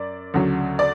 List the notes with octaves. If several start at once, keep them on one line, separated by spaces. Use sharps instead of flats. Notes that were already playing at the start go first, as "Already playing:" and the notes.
Already playing: F#2 D5
D2 C#3 F#3
D5